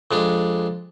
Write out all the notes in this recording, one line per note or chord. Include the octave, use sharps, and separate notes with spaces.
F2 G#3 D4